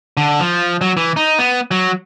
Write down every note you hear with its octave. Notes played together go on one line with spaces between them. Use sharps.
D3
F3
F#3
E3
D#4
B3
F#3